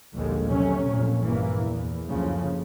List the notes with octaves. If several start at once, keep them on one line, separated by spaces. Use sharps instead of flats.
A#1 D#2 A#2 D3 G3 G#3
C3 F#3 A3 C#4
F2 A#2
A#1 G2 E3 A#3
E2
F#1 D2 C#3 F3